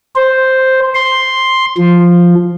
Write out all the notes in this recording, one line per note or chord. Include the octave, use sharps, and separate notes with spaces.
C5
C6
F3